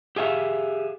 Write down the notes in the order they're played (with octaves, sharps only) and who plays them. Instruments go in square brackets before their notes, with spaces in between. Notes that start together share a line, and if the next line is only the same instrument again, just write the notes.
[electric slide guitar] G4 G#4 E5 F5